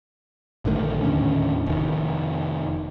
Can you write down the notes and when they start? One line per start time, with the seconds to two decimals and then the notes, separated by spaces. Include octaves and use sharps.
0.65 A#1 D3 D#3 A3
1.03 D#2 A2 D3 C#4
1.66 F1 D#3